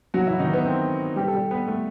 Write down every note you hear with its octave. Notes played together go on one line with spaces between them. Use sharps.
F#3 F#4
E3 E4
D#3 D#4
B3
C4
G3 G4
A4
G3 G4
B3 B4
A3 A4